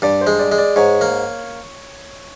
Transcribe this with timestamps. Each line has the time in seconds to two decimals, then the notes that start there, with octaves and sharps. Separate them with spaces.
0.02 G2 D5
0.21 C5
0.27 G#3
0.39 D5
0.52 G#3
0.58 D5
0.76 G#2 C#5
1.01 A#3